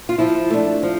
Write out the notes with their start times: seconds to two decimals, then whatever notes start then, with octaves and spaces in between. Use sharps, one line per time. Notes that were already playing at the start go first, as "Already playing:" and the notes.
0.09 F4
0.18 F3 E4
0.50 A3 D4
0.83 F3